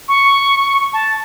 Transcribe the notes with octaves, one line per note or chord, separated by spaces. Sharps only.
C#6
A5